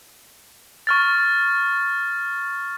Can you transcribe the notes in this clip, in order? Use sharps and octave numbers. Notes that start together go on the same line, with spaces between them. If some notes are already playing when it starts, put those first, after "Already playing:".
C#6 F6 A6